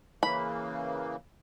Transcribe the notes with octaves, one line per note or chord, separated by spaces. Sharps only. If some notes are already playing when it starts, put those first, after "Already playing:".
C#3 E3 A#3 B5